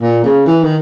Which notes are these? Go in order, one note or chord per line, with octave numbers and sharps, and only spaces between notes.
A#2
C#3
E3
D#3